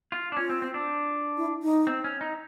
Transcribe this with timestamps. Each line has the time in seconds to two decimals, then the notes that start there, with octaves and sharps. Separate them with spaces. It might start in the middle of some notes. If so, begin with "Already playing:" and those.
0.12 F4
0.32 D4
0.37 C#4 F4
0.49 C4
0.62 C4
0.74 D4
1.37 E4
1.63 D#4
1.87 C4
2.04 C#4
2.21 D#4